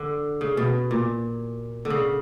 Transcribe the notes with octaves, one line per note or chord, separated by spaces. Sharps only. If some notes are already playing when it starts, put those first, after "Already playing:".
Already playing: D3
C#3
B2
A#2
D3
C#3